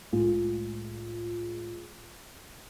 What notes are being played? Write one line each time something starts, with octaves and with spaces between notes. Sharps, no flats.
C2 A2 G#3 A3 F4 G#4